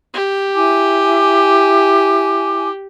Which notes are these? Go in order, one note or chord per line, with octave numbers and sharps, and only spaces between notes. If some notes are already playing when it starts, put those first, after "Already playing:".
G4
E4 G#5 D6